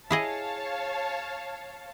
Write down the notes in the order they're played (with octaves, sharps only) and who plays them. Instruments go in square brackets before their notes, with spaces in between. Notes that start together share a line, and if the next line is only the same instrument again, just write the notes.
[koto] E4 G#4 D#5 [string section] C#5 F5 A5